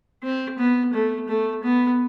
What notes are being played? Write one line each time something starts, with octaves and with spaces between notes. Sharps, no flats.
C4
B3
A3
A3
B3